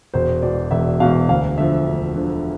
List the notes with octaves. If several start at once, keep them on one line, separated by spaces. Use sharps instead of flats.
E1 C5
E2 B2 D5
E1 E5
E2 B2 F5
D2 F5
D3 F3 E5
D2
D3 F3